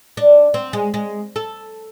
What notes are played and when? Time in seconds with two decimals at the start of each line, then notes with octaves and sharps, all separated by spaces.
0.17 D4
0.54 C4
0.73 G#3
0.94 G#3
1.36 A4